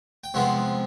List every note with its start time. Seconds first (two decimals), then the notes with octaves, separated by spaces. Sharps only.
0.24 G5
0.34 C3 F3 G#3 B3 F#5